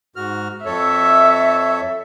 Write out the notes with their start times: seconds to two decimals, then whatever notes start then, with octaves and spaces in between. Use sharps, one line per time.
0.16 G#2 F#4 F6
0.65 F2 A4 C#5 E5